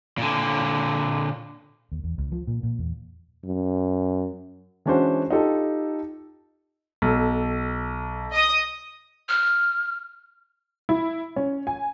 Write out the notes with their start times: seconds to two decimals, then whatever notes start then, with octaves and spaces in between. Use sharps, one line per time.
0.18 A#2 D3
1.92 D#2
2.04 E2
2.18 C#2
2.32 F3
2.47 A#2
2.63 A#2
2.79 E2
3.44 F#2
4.86 E3 G#3 C#4 D4 F#4 C5
5.31 D#4 F4 G4 A4
7.02 B1 A4
8.33 D#5 D#6
9.29 F6
10.89 E4
11.36 C#4
11.67 G#5